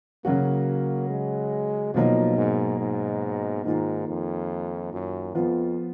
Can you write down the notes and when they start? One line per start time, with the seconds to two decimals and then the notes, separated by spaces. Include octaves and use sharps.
0.25 C#3 F#3 A#3 C#4 F#4
1.10 G#3
1.94 B2 F3 F#3 A#3 D#4
2.38 G#2
2.80 G#2
3.65 G#2 D#3 A#3 F4
4.08 F2
4.93 F#2
5.35 F2 F3 B3 F4